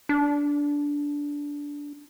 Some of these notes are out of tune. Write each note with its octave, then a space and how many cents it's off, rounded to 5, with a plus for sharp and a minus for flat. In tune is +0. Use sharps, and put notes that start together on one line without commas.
D4 -15